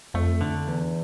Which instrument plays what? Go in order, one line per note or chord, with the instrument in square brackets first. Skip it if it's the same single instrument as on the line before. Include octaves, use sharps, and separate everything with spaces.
[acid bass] F2 [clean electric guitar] A3
[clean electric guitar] D3
E2